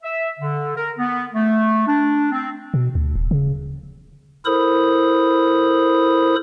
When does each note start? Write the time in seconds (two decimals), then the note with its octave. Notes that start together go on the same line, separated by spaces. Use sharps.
0.03 E5
0.40 D3
0.76 A#4
0.98 B3
1.34 A3
1.87 D4
2.32 C4
2.74 B2
2.95 D2
3.16 D1
3.31 C#3
4.45 E4 A4 A#4 C5 B5 D#6